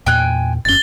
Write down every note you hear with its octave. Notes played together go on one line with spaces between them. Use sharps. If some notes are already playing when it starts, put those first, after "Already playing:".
E2 A#2 G5 G#5 F#6
E1 F#2 C#4 A6 G7